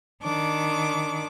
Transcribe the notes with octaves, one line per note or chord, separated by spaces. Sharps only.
D#3 D4 D6